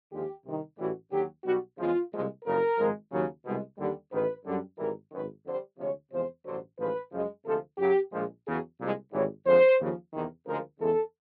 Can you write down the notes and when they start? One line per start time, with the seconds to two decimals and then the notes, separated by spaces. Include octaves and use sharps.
0.11 D#2 D3 F3 G#3 G4
0.45 C2 C3 D#3
0.78 A1 A2 E3 G3 F#4
1.11 D#2 D3 F#3 G4
1.45 B1 B2 G3 F#4
1.78 E2 C#3 F3 G#3 F4
2.11 C2 A#2 F3 G#3
2.45 F#1 F2 C#3 A#4
2.78 G#1 G#2 F3 G#3
3.11 D#2 C#3 F#3
3.45 C2 B2 G#3
3.78 D#2 D3 G3
4.12 A1 G#2 D#3 B4
4.45 F#2 D3 G3
4.78 G#1 G#2 E3 G3 A#4
5.11 G#1 F#2 D#3 B4
5.45 F2 D3 G3 C5
5.79 D2 C3 F3 G#3 C#5
6.12 E2 C3 F3 G#3 C5
6.45 A1 G2 D3 F#3 C5
6.79 A1 G#2 F3 G#3 B4
7.12 F#2 C#3 F3 G#3
7.45 D2 C3 F3 G#3 A4
7.78 F#2 C#3 F#3 G4
8.12 A#1 A#2 F3 G#3
8.45 E2 C#3 F#3 G#4
8.78 C2 A#2 F3 G#3
9.12 G#1 G#2 E3 G3 C#5
9.45 F2 D3 F3 G#3 C5
9.79 D#2 C#3 F3
10.12 E2 C3 D#3
10.45 D2 C#3 F3 G#3 A#4
10.79 E2 C#3 E3 G#3 A4